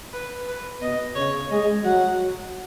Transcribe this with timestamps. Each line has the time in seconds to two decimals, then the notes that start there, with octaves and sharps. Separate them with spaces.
0.13 B4
0.48 B4
0.81 B2 D#5
1.15 C#3 C#5
1.50 G#3 D#5
1.84 F#3 F#5